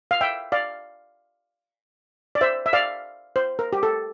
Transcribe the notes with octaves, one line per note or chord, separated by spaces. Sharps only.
F5
E5 G5
D5 F5
D5
C5 E5
E5
D5 F5
C5
A#4
G4
A4